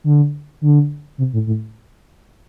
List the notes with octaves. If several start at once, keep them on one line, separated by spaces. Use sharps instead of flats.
D3
D3
C3
A2
A2